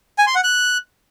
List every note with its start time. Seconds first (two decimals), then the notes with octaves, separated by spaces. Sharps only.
0.18 G#5
0.27 C6
0.35 F#5
0.44 F#6